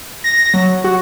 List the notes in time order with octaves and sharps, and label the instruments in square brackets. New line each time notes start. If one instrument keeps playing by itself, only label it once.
[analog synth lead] A#6
F#3
F#4